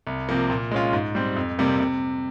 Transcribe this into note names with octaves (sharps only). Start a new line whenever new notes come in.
C2
C3 F3 A#3
A#2
G#3 C#4 F4
G#2
G3 C4
F2
C3 G3 A#3
C3